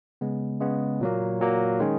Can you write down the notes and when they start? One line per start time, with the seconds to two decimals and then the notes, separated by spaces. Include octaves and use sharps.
0.21 C#3 G#3 B3
0.60 C#3 G#3 B3
1.01 A#2 F#3 A#3
1.40 A#2 F#3 A#3
1.80 D#3 G#3 C#4